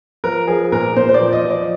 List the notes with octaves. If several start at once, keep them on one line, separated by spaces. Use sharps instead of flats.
F3 A#4
F3 G#4
A#2 A#4
A#2 C5
C5
D5
F3
D#5
F3
D5